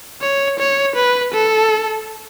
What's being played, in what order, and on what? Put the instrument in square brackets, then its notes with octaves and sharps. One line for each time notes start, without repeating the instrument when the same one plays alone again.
[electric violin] C#5
C#5
B4
A4